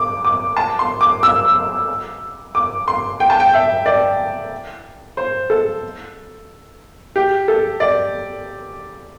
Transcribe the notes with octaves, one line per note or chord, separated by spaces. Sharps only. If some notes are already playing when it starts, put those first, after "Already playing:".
Already playing: D6
D6
A5
C6
D6
E6
D6
C6
G5
A5
G5
E5
D5
C5
A4
G4
A4
D5